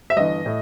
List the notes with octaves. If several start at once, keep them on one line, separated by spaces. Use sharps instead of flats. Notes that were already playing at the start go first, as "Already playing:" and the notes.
E5
G1 G2 E3 D#5
A2